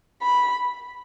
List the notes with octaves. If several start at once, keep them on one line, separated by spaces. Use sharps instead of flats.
B5